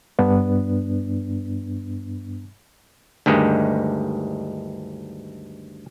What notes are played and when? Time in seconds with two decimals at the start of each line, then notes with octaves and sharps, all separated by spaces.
0.19 G2 B3 D4
3.26 D2 G2 D#3 G#3